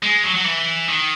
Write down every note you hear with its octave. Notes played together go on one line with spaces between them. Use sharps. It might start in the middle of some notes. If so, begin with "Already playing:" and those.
G#3
F#3
F#3
E3
D#3